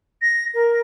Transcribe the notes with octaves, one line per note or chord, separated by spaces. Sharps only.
A#6
A#4